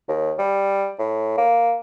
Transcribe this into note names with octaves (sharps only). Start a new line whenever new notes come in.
D#2
G3
A2
A#3